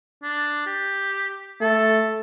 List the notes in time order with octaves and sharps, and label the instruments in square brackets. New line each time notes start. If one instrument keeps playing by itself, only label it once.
[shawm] D4
G4
[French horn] A3 [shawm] A4